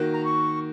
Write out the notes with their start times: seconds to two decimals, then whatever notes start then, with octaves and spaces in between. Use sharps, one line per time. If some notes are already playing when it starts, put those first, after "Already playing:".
Already playing: D#3 A#3 F#4
0.14 A#5
0.24 C#6